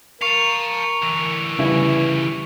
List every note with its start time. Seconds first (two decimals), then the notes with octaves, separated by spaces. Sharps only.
0.21 A#4 F5 A5 C#6 C#7 F7
1.03 D3 E3
1.59 C#3 G3 E4 B4